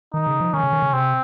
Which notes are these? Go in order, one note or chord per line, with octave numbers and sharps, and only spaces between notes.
D#3 D#4
C#3
F3
D#3 C#4
C#3
D#3
C#3
C3 C4